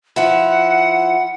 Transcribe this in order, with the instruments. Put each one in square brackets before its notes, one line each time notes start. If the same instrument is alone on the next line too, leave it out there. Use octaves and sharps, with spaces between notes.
[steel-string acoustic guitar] F3 E4 [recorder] F#5